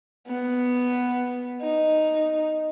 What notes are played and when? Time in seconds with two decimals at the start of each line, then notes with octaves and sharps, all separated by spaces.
0.28 B3
1.62 D#4